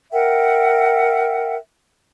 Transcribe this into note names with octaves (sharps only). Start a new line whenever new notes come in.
A#4 E5 F#5 G5